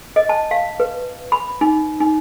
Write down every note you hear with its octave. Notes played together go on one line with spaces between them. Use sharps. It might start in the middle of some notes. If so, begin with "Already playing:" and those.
D#5
A5
F5
B4
B5
D#4
D#4